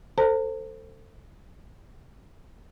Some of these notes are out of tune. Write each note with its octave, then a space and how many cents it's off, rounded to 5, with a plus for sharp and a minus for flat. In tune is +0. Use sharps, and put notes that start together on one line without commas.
A4 +25 C5 +0 A#5 -45